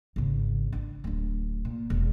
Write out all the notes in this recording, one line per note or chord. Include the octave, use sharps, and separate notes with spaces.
G#1 C#3
D4
D1 D4
A#2
E1